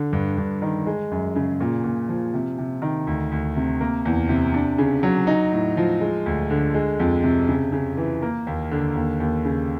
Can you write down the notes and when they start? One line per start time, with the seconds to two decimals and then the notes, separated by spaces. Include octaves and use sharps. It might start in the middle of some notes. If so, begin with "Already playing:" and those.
Already playing: D3
0.13 G2
0.38 G2
0.62 D#3
0.86 G#3
1.11 F#2
1.35 C#3
1.60 A#2
1.84 A#2
2.09 F3
2.34 C3
2.58 C3
2.82 D#3
3.07 D2
3.32 D2
3.56 C3
3.81 A#3
4.05 E2
4.29 C3
4.54 D4
4.78 C#3
5.03 F#3
5.27 D#4
5.52 A2
5.77 F3
6.01 G#3
6.26 D2
6.50 D3
6.74 G#3
6.99 F2
7.23 C3
7.48 C#3
7.72 C#3
7.97 E3
8.22 A#3
8.47 D#2
8.71 D3
8.95 D#2
9.20 D#2
9.45 C#3